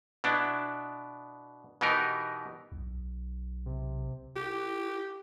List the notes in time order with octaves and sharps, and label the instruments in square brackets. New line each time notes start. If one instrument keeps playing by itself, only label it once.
[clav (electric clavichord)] B2 B3 D4 E4
B2 E3 B3 D#4 G4 A#4
[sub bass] B1
[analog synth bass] C3
[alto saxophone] G4